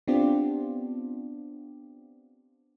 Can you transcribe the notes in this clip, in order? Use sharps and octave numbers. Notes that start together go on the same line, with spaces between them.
B3 C4 D4 F4 G4